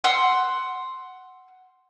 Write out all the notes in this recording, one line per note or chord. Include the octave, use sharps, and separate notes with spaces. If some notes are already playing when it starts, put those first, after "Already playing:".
F#5 C6 E6